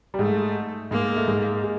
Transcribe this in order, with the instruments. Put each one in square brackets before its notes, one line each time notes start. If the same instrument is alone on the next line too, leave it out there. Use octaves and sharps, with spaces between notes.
[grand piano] G3
[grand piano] G#2 G#3 [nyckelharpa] A3
[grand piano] G#2 G#3 [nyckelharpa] A#3
[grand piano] A3
G#2 G#3
G#3